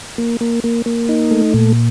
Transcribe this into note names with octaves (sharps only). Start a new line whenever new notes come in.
A#3
A#3
A#3
A#3
D#4
A3
A#2